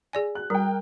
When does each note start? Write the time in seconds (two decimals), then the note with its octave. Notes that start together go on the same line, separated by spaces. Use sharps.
0.13 G#4 D5 G#5
0.35 F#6
0.50 G3 A#4 G5